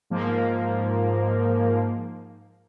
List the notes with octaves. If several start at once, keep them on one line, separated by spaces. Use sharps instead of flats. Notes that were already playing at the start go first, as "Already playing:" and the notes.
G#2 F3 A#3